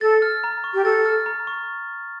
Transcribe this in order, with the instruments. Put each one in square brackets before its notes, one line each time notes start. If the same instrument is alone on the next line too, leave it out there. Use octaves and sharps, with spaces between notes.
[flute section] A4 [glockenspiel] A6
[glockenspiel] F6
A#5
C#6
[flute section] G4
[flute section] A4 [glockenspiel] A6
[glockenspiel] F6
A#5
C#6